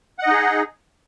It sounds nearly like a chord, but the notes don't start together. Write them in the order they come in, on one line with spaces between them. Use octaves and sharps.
F#5 D#5 D#4 G#4